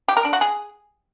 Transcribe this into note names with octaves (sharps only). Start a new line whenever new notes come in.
G4
A#4
D4
F#4
G#4